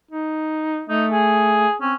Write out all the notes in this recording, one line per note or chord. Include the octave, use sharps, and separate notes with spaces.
D#4
A3 D#4
G#4
C4 C#4